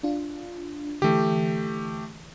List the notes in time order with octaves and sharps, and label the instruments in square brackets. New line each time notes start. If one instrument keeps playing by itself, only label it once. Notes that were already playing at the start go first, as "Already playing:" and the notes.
[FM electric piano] D4 F4
[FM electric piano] D3 E3 [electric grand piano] A3 G4